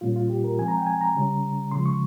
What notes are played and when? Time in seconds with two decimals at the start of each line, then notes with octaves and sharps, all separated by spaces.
0.01 A#2 G3 A#3 C#4 F4
0.16 F4
0.30 G4
0.44 A#4
0.58 F3 G#3 C4 G#5
0.68 A#5
0.77 G5
0.87 G#5
1.01 A#5
1.15 C#3 G3 C#4
1.71 C#3 F3 G#3 C6
1.86 C#6